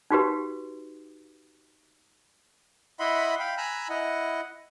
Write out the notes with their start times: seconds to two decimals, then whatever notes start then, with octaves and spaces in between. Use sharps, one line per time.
0.10 D#4 F#4 G4 B4
2.99 E4 D#5 E5 F#5 B5 C6
3.39 F5 G5 B5
3.57 G#5 A#5 B5 E6 F#6
3.89 E4 D#5 F#5